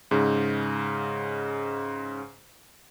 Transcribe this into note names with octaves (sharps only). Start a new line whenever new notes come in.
G#2 C#3